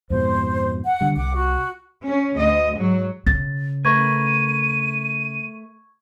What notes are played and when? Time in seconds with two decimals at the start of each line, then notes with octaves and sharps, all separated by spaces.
0.10 F2 G#2 B2 C5
0.85 F#5
1.01 D3 G3
1.16 C2 F#5 D6
1.33 F#4
2.03 C#4
2.35 D2 D#5
2.75 G#2 F#3
3.27 C#3 A6
3.85 A3 A#4 B4 C#6 G#6 D#7